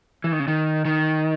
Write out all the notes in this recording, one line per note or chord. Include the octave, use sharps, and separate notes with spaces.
E3
D#3
C#3
D#3
D#3